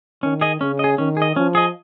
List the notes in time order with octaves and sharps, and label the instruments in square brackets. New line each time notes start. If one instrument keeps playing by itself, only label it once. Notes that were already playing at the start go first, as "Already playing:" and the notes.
[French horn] D#3 [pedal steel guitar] C#4
[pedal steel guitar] G#4 D#5
[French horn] C#3 [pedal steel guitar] C#4
[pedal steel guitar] G#4 D#5
[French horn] D#3 [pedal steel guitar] C#4
[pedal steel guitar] G#4 D#5
[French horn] F3 [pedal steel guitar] C#4
[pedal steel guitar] G#4 D#5